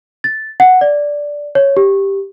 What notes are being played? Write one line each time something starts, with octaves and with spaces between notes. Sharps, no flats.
A6
F#5
D5
C#5
G4